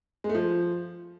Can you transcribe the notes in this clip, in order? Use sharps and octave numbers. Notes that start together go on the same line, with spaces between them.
G#3
A3
F3